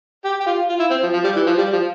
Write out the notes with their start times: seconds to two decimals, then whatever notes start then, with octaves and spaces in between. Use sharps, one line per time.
0.25 G4
0.40 G4
0.46 F4
0.69 F4
0.79 E4
0.91 C4
1.03 F3
1.13 F3
1.24 G3
1.36 E3
1.46 F3
1.58 G3
1.73 F3